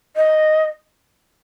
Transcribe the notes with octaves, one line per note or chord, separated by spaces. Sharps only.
D#5